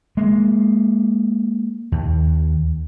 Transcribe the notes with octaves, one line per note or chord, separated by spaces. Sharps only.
G#3 A#3
D#2